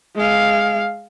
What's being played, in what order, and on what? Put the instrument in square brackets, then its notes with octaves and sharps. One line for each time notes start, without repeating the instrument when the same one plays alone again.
[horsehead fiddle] G#3 F5